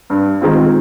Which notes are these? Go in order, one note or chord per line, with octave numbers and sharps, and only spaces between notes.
G2
D#3 G#3 C4 F4